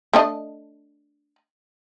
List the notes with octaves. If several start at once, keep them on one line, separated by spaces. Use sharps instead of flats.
A3 D4 D#5